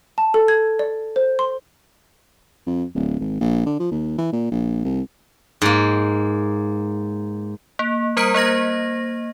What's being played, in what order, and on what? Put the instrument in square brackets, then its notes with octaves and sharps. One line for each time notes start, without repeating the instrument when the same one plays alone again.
[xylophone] A5
A4
G#6
D5
C5
C6
[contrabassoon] F2
D1
G#1
A#1
D3
F3
D#2
E3
A#2
A#1
C2
[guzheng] G#2 A#3
[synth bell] A#3
G3 A#4 C5 A#5 B6 D7
A#3 C5 D#5 A#6